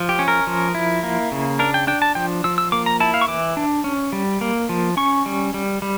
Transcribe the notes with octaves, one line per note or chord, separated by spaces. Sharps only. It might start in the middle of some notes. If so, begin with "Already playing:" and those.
Already playing: F3
G4
C#4
A#4
F3
E4
A#3
C#3
D4 A#4
G5
D4 G5
A5
F3 G5
F3 E6
E6
A#3 D6
A#5
E4 A5
F5
C#6
E3 D6
D4
C#4
G3
A#3
F3
C#4 C#6
G3
G3
G3